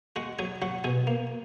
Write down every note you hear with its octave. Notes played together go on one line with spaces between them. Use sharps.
G#3 F#4 F#5
F#3 G#4 G#5
F#3 F#4 F#5
B2 G#4 G#5
A#3